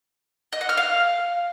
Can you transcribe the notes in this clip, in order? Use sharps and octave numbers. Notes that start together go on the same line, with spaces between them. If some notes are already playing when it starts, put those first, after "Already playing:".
D#5
F#5
F6
F5